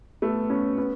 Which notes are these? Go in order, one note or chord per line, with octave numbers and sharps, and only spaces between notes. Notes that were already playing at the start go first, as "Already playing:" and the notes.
A3 B3
B3 C#4
B3 C#4